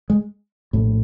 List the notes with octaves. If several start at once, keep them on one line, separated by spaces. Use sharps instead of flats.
G#3
A#1 A2